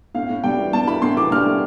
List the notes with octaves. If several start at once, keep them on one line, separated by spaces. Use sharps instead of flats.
A2 F5
A2
G3 G5
E3
G3 A5
E3 B5
A2 C6
E3 D6
G3 F6
A2